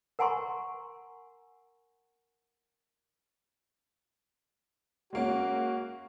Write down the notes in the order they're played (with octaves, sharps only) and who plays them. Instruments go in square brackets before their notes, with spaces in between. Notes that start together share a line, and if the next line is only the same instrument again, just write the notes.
[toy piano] A#4 F#5 G#5 A#5 C6 C#6
[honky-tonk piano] G#3 A#3 C#4 [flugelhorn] F#4